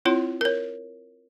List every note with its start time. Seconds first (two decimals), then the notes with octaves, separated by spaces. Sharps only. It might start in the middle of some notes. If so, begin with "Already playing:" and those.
0.05 C4 E4 F4 C#5
0.41 A#4 C#5